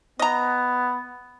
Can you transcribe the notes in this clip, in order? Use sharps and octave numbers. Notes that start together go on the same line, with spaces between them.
B3 D#5 A#5